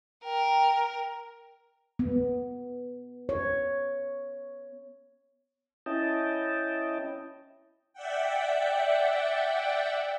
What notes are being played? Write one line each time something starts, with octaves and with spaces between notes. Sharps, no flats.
A#4 G5
B3
C#5
C#4 E4 D#5 G5 A5
D5 E5 F#5 G5